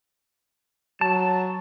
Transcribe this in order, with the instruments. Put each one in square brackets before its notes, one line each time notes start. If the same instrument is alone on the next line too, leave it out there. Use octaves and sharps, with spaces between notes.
[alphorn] F#3 [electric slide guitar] A5